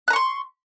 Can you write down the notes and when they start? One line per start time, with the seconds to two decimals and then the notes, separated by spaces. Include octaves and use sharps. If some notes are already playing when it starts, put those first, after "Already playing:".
0.08 F#6
0.10 A#5
0.13 C#6
0.16 C6